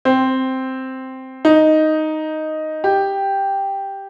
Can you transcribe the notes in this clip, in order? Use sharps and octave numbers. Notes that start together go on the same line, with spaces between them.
C4
D#4
G4